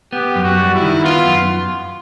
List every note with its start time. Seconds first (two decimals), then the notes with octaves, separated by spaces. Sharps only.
0.13 B3 G4
0.36 F#2
0.43 F#4
0.57 G3
0.74 E4
0.81 D#3
1.03 B3 F4
1.26 F#2